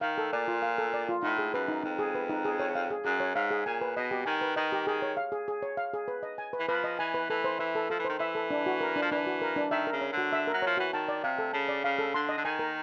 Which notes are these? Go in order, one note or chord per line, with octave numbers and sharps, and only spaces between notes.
D#3 F5
A4
A#2 D5
F4
F5
A4
D5
F4
A2 D#4
G#4
F#2 B4
D#4
F2 D#4
G#4
B4
D#4
G#4
C#5
F5
G#4
F#2 G#4
C#5
G#2 F5
G#4
A#2 G#5
B4
B2 D#5
G4
D#3 G#5
B4
D#3 D#5
G4
D#3 G#4
C#5
F5
G#4
G#4
C#5
F5
G#4
B4
D#5
G#5
B4
E3
F3 B4
D#5
E3 G#5
B4
E3 A4
C5
E3 E5
A4
F3 A4
E3
D#3 C5
E3 E5
A4
D4
F#4
A#4
D4
F3
E3 D4
F#4
A#4
D4
D#3 E5
A#4
C#3
C#5
D3
F#4
E5
A#4
F#3
F3 C#5
E3 F#4
D#3 A5
D5
C3 F5
A4
C#3 A5
D5
C#3 F5
A4
D3 C6
D#5
D3
D#3 G#5
A#4